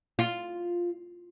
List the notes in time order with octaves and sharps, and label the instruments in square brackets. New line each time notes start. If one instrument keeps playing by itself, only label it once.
[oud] F4